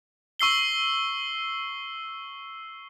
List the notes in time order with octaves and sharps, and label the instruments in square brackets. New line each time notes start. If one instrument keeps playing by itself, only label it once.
[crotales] C#6 E6 C7 G7